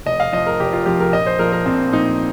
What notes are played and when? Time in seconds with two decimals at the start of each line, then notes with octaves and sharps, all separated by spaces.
0.06 F1 D#5
0.20 F5
0.33 F2 F3 D#5
0.47 A#4
0.60 F1 G4
0.73 F4
0.86 F2 F3 G4
1.00 A#4
1.12 A#1 D#5
1.27 C5
1.39 A#2 F3 A#4
1.52 A#4
1.65 A#1 C4
1.93 A#2 F3 D#4